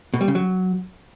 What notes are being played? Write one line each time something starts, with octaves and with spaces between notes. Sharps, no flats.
B2
G3
C#3
F#3